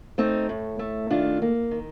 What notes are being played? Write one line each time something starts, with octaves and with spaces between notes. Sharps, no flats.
A3 C4 D#4
A2
A3
D#3 D4 F4
A#3
D#3